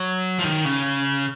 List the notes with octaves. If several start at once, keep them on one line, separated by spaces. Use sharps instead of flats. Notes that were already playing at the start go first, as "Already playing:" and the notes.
Already playing: F#3
F3
D#3
C#3